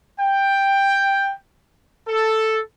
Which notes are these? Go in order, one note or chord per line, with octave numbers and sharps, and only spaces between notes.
G5
A4